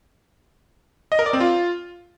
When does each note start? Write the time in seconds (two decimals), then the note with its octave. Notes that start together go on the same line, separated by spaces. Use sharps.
1.12 D#5
1.19 A#4
1.26 D5
1.33 C4
1.40 F4